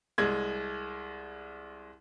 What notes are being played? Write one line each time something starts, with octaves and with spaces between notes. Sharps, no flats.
C2 G#3 G#6